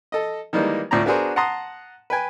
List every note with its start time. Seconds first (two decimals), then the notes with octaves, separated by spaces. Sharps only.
0.12 A4 D#5
0.53 D#3 E3 G3 G#3 A#3
0.91 D2 A2 F3 D5 A#5
1.06 B3 D4 F#4 G#4 A#4 C5
1.36 F#5 A5 A#5 C6 D#6
2.10 B4 G5 G#5